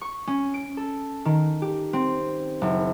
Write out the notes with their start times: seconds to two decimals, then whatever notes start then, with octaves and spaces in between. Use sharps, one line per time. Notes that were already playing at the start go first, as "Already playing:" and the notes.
0.01 C#6
0.27 C#4
0.54 D7
0.77 A4
1.25 D#3
1.62 G4
1.93 C4
2.61 F#1